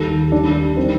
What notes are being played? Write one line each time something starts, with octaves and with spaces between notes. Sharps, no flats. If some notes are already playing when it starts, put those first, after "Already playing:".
Already playing: D#2 D#3 G3 A4
D#2 D#3 G3 D4
D#3 G3 C4